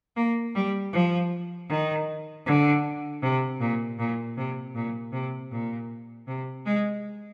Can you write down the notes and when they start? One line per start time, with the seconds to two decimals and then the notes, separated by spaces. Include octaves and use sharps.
0.16 A#3
0.54 G3
0.92 F3
1.68 D#3
2.45 D3
3.22 C3
3.59 A#2
3.98 A#2
4.36 C3
4.74 A#2
5.12 C3
5.50 A#2
6.27 C3
6.65 G#3